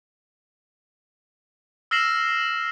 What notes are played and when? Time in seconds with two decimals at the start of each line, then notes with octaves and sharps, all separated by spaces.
1.91 E6 F6 A#6 C7 E7 F#7